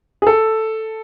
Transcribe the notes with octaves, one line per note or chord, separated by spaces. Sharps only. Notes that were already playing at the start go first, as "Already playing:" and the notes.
G#4
A4